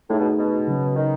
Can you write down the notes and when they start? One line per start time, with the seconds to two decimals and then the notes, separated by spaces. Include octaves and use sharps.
0.10 A2 A3 D#4 G#4
0.20 B2
0.39 B2
0.68 C#3 F#3 C#4
0.96 D#3